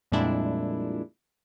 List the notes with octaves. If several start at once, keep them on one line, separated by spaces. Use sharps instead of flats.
F2 A#2 G3 G#3 D4 E4